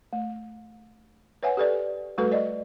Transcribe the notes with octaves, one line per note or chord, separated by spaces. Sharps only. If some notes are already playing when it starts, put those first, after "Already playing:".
A3
B4 C#5 E5 F#5 G#5
G4 A4 B4 D5
G3 A3 F#4 A4 B4
D5 D#5